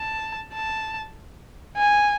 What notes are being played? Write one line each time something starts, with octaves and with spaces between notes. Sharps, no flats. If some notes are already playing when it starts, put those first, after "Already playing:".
Already playing: A5
A5
G#5